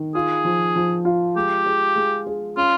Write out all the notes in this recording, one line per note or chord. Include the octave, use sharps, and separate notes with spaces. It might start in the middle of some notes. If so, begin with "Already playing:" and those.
Already playing: D#3
F4 G#4
F3
F3
F4
G#3 G4
G#4
G#3
G#4
C#4 F4